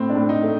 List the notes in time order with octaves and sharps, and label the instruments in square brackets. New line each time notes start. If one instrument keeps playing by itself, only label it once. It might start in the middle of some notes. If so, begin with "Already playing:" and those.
Already playing: [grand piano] A2 C4
D4
A2
D#4
A3